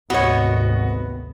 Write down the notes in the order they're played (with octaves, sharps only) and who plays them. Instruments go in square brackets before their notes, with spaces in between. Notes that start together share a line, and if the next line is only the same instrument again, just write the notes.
[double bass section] G#1 D2 C3 [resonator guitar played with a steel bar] B3 C#5 [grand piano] F#4 D#5